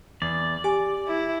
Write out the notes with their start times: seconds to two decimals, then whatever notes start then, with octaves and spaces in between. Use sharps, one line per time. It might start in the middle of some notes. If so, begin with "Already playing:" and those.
0.22 E2 D5
0.64 G4 G#5 D6
1.07 E4